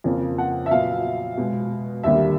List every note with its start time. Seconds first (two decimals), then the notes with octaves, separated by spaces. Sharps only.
0.04 F2 C#3 F3 A#3
0.38 F#5
0.66 E5
0.71 A#2 F#3 B3 F5
1.37 B2 G#3 B3
2.03 D#2 D3 G3 A#3 E5